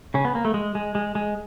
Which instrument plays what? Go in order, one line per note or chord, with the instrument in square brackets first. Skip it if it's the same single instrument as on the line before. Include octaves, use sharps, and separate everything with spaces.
[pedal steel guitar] C#3 C#4
B3
A#3
A3
G#3
G#3
G#3
G#3